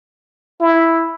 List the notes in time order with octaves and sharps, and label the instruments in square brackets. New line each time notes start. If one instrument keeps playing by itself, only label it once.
[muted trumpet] E4